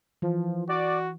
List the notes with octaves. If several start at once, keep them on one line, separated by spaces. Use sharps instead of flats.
E3 F3
F#4 D5